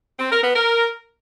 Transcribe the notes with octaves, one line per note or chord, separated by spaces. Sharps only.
C4
A#4
B3
A#4